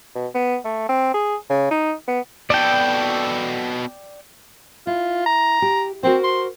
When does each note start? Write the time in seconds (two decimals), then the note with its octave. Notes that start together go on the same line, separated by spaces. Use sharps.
0.15 B2
0.34 B3
0.65 A3
0.89 C4
1.14 G#4
1.50 C#3
1.71 D#4
2.08 B3
2.50 B2 A4 D5 G5
4.87 E4 F4
5.26 A#5
5.62 G4
6.03 C4 F#4 A#4 C5
6.24 C6